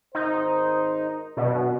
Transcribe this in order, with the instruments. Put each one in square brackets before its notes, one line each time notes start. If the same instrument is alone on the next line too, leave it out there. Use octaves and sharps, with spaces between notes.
[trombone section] G#1 A#4 C5 [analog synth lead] D#4
[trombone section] F#2 D#3 D4 [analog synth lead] B2